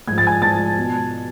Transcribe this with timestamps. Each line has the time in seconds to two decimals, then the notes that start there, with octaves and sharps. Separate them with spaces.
0.08 G#2 F3 G#6
0.18 A6
0.27 G#5 G#6
0.42 G#2 F3 A5 A6
0.78 B2